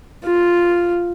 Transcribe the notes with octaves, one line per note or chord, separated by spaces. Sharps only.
F4